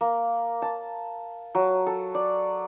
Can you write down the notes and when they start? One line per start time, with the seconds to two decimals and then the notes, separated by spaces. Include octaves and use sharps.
0.01 A#3
0.62 A5
1.55 F#3
1.87 A4
2.14 D5